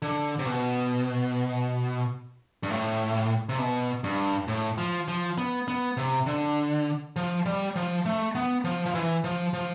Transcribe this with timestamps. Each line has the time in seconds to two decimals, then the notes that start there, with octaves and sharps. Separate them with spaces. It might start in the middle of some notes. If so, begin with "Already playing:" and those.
0.02 D3
0.39 C3
0.46 B2
2.63 G2
2.70 A2
3.49 C3
3.59 B2
4.04 G2
4.48 A2
4.78 F3
5.08 F3
5.38 B3
5.68 B3
5.97 C3
6.26 D3
7.16 F3
7.46 G3
7.76 F3
8.06 A3
8.35 B3
8.64 F3
8.86 F3
8.94 E3
9.24 F3
9.54 F3